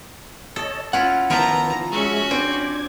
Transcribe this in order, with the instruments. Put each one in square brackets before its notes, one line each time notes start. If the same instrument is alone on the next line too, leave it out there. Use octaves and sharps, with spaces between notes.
[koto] A4 [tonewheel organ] C#5 D#5 A5
[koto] C#4 E4 F4 [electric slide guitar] F#5 [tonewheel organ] F6
[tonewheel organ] D#3 B3 [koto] F3 E4 F4 [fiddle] A#5
[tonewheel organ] G#3 G#4 E5 [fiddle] C#4 F#4
[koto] C4 [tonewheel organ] D4 D6 G#6